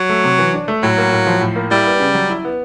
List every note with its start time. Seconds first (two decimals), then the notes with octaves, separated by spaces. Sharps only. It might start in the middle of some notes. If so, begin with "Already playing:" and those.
Already playing: F#3
0.09 A3
0.24 C3
0.38 E3
0.54 D4
0.68 A3
0.83 A2 F#3
0.97 A#3
1.12 A2
1.27 F3
1.41 A2
1.56 A#3
1.71 G3 E4
1.86 B3
2.00 C#3
2.15 F#3
2.30 E4
2.45 B3